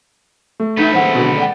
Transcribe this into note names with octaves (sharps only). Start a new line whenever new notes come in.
A3
E2 D#4 A4 B4 E5
F2 D#3 G#3 E4 C5 F#5
B2 D3
D5 F#5 G5